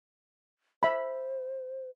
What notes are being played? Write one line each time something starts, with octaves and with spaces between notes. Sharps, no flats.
C5 E5 B5